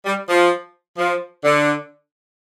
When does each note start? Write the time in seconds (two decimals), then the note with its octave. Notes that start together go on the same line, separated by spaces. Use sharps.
0.05 G3
0.29 F3
0.98 F3
1.44 D3